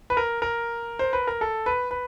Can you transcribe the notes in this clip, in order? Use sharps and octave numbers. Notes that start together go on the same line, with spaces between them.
B4
A#4
A#4
C5
B4
A#4
A4
B4
B4